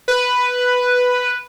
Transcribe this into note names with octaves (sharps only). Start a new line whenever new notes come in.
B4